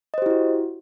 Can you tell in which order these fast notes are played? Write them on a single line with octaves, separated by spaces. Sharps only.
D#5 C5 G4 E4 F#4